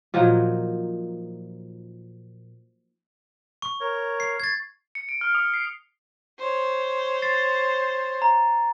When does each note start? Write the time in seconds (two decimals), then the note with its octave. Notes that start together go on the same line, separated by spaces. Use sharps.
0.14 A#2 F3 F#3 D#4
3.62 C#6
3.81 A#4 C#5
4.20 C7
4.40 G#6 A6
4.95 C#7
5.09 D7
5.21 F6
5.35 D#6
5.54 C7
6.39 C5 C#5
7.22 A6 C7
8.22 A#5